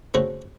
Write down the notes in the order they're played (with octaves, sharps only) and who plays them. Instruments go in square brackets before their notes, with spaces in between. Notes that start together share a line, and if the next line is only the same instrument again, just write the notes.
[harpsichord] C#3 A3 C4 F#4